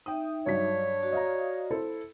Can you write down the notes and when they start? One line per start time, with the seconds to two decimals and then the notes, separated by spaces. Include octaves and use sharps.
0.06 D#4 E5 G5 D#6
0.46 G2 F#3 C#5 B6
1.00 F#4 D5
1.12 D#5 F5 A#5
1.71 E4 A4 C5